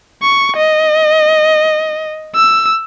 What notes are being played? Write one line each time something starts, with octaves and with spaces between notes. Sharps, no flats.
C#6
D#5
E6